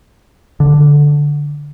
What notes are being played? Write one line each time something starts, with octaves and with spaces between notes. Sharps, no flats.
D3